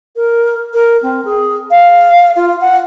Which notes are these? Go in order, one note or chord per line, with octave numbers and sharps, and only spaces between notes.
A#4
A#4
C4
G#4
F5
F4
F#5